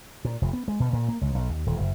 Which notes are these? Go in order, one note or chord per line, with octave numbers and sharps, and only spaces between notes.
A#2
F1
B3
G#3
B2
A#2
A#3
C#2
B1
D#2
D#1
F#1